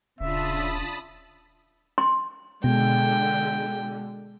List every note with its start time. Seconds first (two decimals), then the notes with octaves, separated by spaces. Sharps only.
0.20 D#1 C#3 D4 F4 E5 A5 B5 D#6
1.98 C6
2.64 B2 D3 G#3 G5